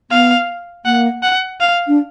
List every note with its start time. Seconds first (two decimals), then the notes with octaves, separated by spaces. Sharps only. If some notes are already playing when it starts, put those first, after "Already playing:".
0.11 B3 F5
0.85 A#3 F#5
1.23 F#5
1.60 F5
1.87 D4